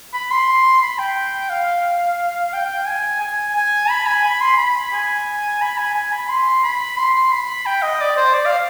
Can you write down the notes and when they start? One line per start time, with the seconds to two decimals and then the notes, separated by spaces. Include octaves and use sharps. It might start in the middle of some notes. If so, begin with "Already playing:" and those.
0.14 B5
0.31 C6
0.82 B5
0.99 G5
1.50 F5
2.53 G5
2.87 G#5
3.21 G#5
3.56 G#5
3.89 B5
4.07 G#5
4.24 B5
4.41 C6
4.57 B5
4.93 G#5
5.61 B5
5.78 G#5
5.95 G#5
6.12 B5
6.29 C6
6.63 B5
6.98 C6
7.15 C6
7.32 B5
7.66 G5
7.82 D#5
8.01 D5
8.17 C5
8.34 D5
8.45 F5